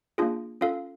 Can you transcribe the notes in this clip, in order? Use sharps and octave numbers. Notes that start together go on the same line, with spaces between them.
A#3 D4 F4 G#4
C#4 F4 A4 F5